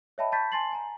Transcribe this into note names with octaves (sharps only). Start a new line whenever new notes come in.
C#5 D#5 E5 G5 A5 B5
A5 B5 C#6 G6 A6 B6
G#5 A5 C6 A6 C7 F#7
G#5 A#5